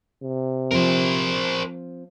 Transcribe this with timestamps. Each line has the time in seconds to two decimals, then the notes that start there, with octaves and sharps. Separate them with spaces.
0.23 C3
0.71 F3 C4 A#4 C5